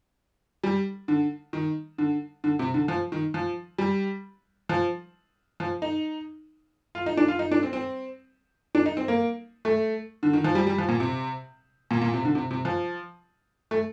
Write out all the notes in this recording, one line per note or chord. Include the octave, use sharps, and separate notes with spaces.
G3
D3
D#3
D3
D3
C3
D3
F3
D#3
F3
G3
F3
F3
D#4
F4
D#4
D4
F4
D#4
D4
C4
C4
D4
D#4
C4
A#3
A3
D3
D#3
F3
G3
G3
F3
A#2
C3
A#2
A#2
C3
D3
C3
C3
F3
A3